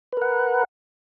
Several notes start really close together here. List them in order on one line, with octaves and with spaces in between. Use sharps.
B4 A#4 F#5